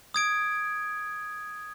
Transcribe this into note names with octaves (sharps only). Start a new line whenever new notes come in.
D#6 G#6 D7